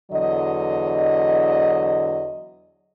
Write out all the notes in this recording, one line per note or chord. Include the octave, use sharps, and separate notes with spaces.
E2 D3 F#3 D#5